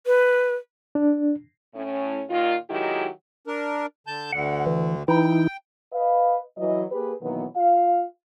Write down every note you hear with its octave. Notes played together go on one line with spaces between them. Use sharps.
B4
D4
A2 C#4
D#2 A#2 D#3 F4
D#3 F#3 G#3 E4 F#4 G4
D4 A#4
D3 A5 G6
D2 D3 F#5
E3
E3 D#4 E4 G5
B4 D#5 F5
E3 F#3 D#5
A#3 G4 G#4 B4
B2 D#3 E3 F#3 A#3 B3
F4 F5